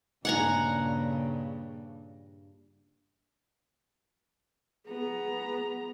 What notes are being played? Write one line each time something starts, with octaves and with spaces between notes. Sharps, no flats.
G2 A#2 C#3 F#5 G#5 A#5
B3 G#4 A#5